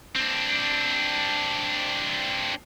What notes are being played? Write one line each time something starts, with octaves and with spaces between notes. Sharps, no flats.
C4 D4